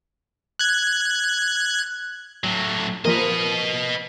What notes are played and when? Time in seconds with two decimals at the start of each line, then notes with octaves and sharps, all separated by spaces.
0.59 F#6 G#6
2.44 A2 F#3
3.05 F3 A#3 A#4 B4 D#5